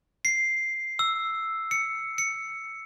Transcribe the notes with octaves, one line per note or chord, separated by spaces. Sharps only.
C7
E6
C#7
C#7